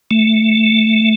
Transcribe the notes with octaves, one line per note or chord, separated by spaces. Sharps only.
A3